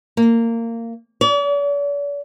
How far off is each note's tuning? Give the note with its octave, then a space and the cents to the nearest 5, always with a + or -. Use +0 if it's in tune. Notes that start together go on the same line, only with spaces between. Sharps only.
A#3 -20
D5 -45